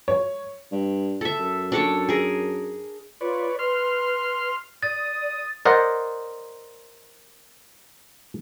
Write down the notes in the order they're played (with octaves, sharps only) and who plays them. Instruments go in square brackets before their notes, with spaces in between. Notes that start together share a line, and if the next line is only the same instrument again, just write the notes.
[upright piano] C#5
[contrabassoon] G2
[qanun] A4 E5
[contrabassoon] F#2
[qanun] D4 A4 C#5
G#4 A#4
[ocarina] F4 [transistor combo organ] B4 C#5 D5
[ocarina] B4 [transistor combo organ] C6 F6
[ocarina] D5 [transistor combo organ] D#6 [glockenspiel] A6
[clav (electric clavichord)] A#4 C5 D5 D#5 F#5